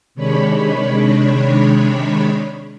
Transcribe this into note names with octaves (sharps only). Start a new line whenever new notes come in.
C3 D#3 G#3 D4 C#5 B5